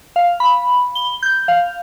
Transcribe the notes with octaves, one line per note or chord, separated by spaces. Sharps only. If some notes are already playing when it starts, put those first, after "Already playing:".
F5
B5
G7
G6
F5